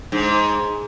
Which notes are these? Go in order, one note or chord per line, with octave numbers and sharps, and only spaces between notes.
G#2